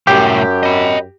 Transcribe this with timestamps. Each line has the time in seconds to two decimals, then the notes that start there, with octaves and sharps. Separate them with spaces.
0.07 C2 F#2 A2 G4
0.63 D#5 B5